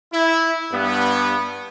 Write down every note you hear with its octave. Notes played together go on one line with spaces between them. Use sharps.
E4
G2 B3